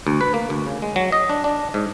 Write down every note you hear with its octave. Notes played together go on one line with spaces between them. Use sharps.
D2
B4
A#3
D2
C#3
G#3
F#3
D#5
D4
D4
G#2